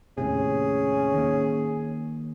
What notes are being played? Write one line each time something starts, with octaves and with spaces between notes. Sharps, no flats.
D#2 A2 C3 C#4 G#4
D#3 A#3